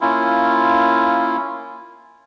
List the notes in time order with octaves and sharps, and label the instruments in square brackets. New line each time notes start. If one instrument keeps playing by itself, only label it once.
[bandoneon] A#3 C#4 E4 F4